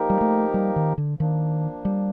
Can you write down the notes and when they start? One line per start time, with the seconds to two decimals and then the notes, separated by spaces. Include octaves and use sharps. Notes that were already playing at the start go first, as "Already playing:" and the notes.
Already playing: F3 A#3 D#4 G4 A#4
0.10 G3
0.21 A3
0.54 G3
0.76 D#3
0.98 D3
1.19 D#3 F3 A#3 D4
1.85 G3